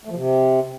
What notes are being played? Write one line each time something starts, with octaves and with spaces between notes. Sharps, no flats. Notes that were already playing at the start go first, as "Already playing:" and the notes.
A3
F3
C3